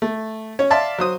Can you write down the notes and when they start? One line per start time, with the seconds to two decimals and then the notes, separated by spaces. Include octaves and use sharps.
0.02 A3
0.59 C#4 C#5
0.70 D5 E5 F5 A5 C6
0.99 F#3 C5 D#6